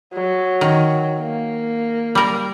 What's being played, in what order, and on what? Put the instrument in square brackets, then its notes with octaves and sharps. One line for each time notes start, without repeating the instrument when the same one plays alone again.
[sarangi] F#3
[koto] D#3
[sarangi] A#3
[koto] G3 A#4